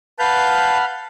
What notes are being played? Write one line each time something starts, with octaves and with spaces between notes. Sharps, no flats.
B4 F5 F#5 A5 B5 F6 G6